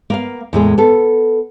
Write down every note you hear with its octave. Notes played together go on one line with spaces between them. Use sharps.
A#3 B3 F5
E2 A2 G#3 A#3
B3 A4